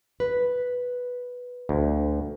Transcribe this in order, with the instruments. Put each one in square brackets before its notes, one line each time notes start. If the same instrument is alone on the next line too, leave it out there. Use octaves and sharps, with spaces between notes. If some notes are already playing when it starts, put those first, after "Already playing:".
[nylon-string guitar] B4
[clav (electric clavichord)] D2